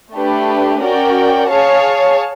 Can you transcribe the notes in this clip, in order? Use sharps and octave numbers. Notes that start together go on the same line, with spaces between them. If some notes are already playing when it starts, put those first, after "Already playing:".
A3 D4 G4 B4
C#4 F#4 A#4 D5 G5
G#4 C#5 F5 A5